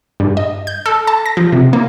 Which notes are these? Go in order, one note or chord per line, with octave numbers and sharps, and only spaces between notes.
G2
D#5
G6
A4
A5
A#6
F3
C3
A#3